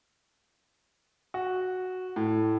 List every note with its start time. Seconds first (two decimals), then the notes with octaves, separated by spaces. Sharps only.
1.34 F#4
2.16 A2